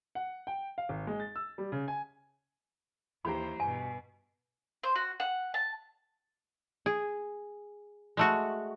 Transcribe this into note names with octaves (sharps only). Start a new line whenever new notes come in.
F#5
G5
F5
G#1
G#3
A6
E6
G3
C#3
G#5
D#2 E3 G4 C5 A#5 B5
G2 B2 G#5
C5
F#4
F#5
A5
G#4
G#3 A3 F#4